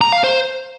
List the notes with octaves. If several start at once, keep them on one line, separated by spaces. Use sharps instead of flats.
A#5
F5
C5